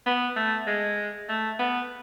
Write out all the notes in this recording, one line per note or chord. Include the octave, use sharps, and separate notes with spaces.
B3
A3
G#3
A3
B3